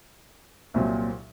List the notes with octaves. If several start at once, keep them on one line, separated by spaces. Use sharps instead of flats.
C2 A#2 F#3 C4